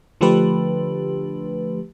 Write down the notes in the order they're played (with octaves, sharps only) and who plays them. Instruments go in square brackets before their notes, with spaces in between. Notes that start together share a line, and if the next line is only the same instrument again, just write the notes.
[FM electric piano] D3 F3 A3 D4 G4 B4